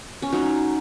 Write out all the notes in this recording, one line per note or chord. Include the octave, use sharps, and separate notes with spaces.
C#4
F#3 D#4